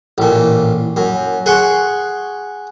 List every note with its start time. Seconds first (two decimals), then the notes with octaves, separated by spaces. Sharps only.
0.18 A1 A#2
0.96 F#2
1.46 G#4 F#5 C6 C#6